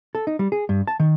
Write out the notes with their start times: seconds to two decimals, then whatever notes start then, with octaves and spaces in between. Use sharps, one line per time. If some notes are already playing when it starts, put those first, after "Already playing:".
0.15 A4
0.27 D#4
0.39 G3
0.52 G#4
0.69 G2
0.87 A5
1.00 D#3